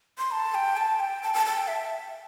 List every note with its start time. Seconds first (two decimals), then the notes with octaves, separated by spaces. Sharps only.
0.18 C6
0.31 A5
0.55 G5
0.77 A5
1.00 G5
1.23 A5
1.34 A5
1.46 A5
1.57 G5
1.68 E5